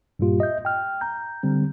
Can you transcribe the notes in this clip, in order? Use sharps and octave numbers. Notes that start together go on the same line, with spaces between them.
G2 A#2 G3 A#3 F4 G4
D#5 E5 G6
G5 F6
A#5 G6
D3 G3 C4